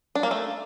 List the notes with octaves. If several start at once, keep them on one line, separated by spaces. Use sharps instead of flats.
D4
A#3
A3